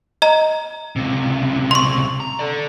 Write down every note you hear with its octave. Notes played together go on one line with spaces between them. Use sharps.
D#5 A#5
C#2 C3
C6 C#6
A#5
A4 D5